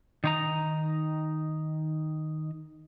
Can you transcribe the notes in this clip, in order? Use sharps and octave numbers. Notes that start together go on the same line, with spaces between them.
D#3 D#4 A#5